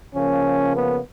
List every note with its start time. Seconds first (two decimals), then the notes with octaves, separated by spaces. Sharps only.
0.15 C#3 F3 A#3 C#4
0.75 B3